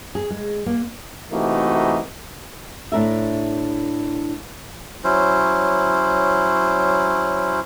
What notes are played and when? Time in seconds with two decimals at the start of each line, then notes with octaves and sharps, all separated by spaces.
0.15 G#4
0.30 G#3
0.66 A#3
1.31 C3 E3 A3 A#3 D#4 F#4
2.92 A2 D4 A#4 E5
5.04 F#3 C#4 E4 C5